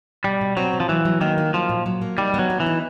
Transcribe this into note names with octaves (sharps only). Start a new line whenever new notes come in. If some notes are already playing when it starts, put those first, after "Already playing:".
B2 G3
B2
F#3 C4
B2
F3
E3 F#3
F#3
D#3 A#3
A#3
F3 F#3
A#2
F#3
A#3
G3 D#4
B3
F#3
B3
E3
D#4